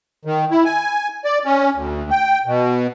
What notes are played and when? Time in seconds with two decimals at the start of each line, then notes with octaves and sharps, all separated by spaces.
0.25 D#3
0.51 E4
0.65 G#5
1.25 D5
1.45 C#4
1.75 D2
2.11 G5
2.46 B2